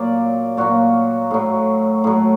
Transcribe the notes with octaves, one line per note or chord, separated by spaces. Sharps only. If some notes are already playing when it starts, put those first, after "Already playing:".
Already playing: A#2 F#3 D5
A#2 F#3 F#4
A2 F#3
A2 F#3